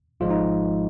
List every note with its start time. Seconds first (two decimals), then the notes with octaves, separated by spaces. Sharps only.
0.20 G#1 G#2 F3 G#3 F4
0.30 D#4